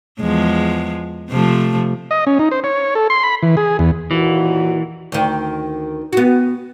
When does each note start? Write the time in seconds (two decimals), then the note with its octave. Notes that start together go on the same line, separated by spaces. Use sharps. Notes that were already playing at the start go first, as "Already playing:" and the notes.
0.20 E2 F3 G#3
1.30 C3 F3 A3
2.11 D#5
2.27 C#4
2.39 D#4
2.51 C5
2.64 C#5
2.95 A4
3.10 C6
3.23 B5
3.43 E3
3.57 G#4
3.79 E2
4.11 D#2 A#2 E3 F#4
5.12 D2 D#3
6.13 B3 F#4